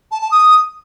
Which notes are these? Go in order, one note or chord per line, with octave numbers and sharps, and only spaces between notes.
A5
A5
D#6